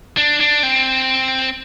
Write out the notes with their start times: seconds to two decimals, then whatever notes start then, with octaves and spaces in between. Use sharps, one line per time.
0.17 D4
0.40 D4
0.63 C4